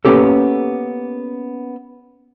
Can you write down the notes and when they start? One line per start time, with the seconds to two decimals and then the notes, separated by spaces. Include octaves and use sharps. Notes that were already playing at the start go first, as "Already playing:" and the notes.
0.05 A#3 B3 C#4 G4 A4